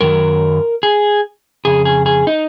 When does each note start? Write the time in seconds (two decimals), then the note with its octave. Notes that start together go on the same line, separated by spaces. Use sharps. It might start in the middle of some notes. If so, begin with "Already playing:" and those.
0.01 F#2 D#3 F#3 A#4
0.83 G#4
1.65 F2 C#3 G#4
1.85 G#4
2.06 G#4
2.27 D#4